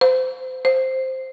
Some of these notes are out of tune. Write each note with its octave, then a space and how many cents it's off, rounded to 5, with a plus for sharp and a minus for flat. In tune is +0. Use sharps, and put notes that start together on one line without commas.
C5 -30
C5 +5